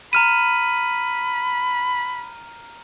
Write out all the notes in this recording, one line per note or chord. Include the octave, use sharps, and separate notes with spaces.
A#5 B5 F6 D#7